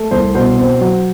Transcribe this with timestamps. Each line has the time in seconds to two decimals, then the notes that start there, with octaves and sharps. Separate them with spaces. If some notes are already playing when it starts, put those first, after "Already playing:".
Already playing: A3
0.11 C2 C5
0.35 B2 C5
0.59 C4
0.81 F#3